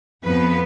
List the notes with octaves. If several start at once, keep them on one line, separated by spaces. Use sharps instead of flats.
F2 F3 B3 B4